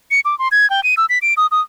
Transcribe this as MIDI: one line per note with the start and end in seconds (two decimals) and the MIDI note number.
0.11 0.20 97
0.25 0.37 86
0.39 0.48 84
0.52 0.69 92
0.70 0.83 79
0.83 0.95 99
0.97 1.06 88
1.09 1.18 95
1.22 1.34 98
1.37 1.47 87
1.51 1.61 87